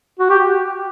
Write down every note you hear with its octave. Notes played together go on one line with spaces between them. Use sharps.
F#4
G4